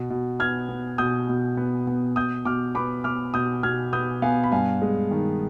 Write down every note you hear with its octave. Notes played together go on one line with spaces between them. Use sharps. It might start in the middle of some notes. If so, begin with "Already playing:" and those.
Already playing: B2
B2
B3 F6 G#6
B3
B2 D#6 G6
B2
B3
B3
B2 D#6 G6
B2 D6 F6
B3 B5 D6
B3 D6 F6
B2 D#6 G6
B2 F6 G#6
B3 D#6 G6
B3 F5 G#5
B5
G2 F5 G#5
G#3
D#3